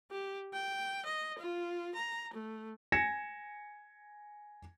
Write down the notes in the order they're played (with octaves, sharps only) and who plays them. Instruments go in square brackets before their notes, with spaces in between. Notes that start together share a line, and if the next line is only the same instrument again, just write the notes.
[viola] G4
G5
D#5
F4
A#5
A3
[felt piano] G#5 G#6 A#6 C#7 E7